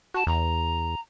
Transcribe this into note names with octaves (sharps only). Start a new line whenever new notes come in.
F#4 A5
E2 A#5